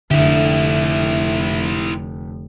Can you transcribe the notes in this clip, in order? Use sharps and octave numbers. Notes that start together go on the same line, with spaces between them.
F1 D3 E4 G4 E5